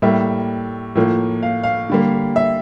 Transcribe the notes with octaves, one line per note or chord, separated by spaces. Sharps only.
A2 G3 A#3 E5
A2 F3 A#3
F5
F5
D3 G3 A#3
E5